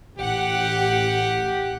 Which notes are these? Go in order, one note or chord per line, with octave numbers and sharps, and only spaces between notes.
A1 G4 F#5